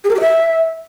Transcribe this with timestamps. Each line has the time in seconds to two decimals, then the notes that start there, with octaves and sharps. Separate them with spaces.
0.04 G#4
0.10 A#4
0.15 G4
0.20 E5